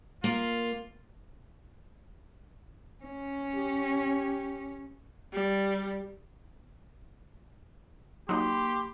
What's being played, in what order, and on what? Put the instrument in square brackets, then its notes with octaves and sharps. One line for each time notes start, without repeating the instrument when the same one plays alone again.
[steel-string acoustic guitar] A#3 [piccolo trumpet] F4
[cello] C#4
[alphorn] G4
[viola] G3
[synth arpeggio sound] F#3 D#4 [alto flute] A#3 [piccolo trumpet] G4 [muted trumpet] C6